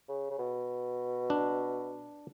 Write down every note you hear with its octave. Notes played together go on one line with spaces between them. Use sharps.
C#3
C#3
B2
D4